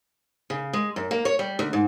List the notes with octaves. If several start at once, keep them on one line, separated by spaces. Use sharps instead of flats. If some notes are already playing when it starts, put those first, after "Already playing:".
C#3
G#3
F#2
A#3
C#5
G3
D2
G#2